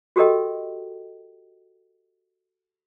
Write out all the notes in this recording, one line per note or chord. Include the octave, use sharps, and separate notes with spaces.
F#4 G4 A4 A#4 D#5 G5